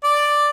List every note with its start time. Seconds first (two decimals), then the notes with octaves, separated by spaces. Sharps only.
0.04 D5